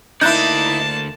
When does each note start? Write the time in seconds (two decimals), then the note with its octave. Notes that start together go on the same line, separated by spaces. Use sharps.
0.21 D2 A#3 D#4 E4 D5 A5 F#6 G6